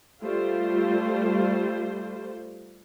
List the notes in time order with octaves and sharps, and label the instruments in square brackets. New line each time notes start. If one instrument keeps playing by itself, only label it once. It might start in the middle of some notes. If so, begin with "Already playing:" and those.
[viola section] G3 A3 F4 C5